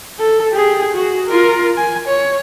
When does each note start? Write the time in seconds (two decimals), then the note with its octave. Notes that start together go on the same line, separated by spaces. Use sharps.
0.19 A4
0.52 G4 G#4
0.94 F#4 G#4
1.26 F4 A#4
1.77 G#5
2.07 C#5